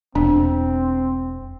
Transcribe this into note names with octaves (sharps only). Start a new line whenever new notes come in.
E1 C4 D4